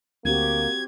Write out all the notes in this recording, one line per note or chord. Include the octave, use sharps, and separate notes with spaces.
D2 A#3 C4 F#4 G4 G#6